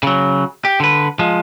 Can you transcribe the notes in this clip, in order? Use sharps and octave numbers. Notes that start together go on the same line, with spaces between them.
C#3 F#3
G4
D3 B4
F3 G#3